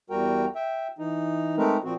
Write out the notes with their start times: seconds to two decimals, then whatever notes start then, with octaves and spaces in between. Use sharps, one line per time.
0.10 E2 G3 F#4 A#4 G5
0.55 E5 G5
0.99 E3 D#4
1.57 G#3 A3 C4 D#4 A#4 B4
1.84 A#2 F3 C4 F#4